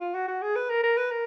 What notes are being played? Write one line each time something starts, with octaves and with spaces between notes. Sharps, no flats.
F4
F#4
F#4
G#4
B4
A#4
A#4
B4
A#4